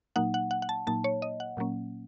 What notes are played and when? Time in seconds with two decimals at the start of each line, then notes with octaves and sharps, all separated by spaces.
0.16 A#2 F#3 A#3 D#4 F#5
0.34 F#5
0.51 F#5
0.62 F#5
0.69 A5
0.87 A#2 F#3 A#3 D#4 A5
1.04 C#5
1.22 D#5
1.40 F#5
1.57 A#2 F#3 A#3 C#4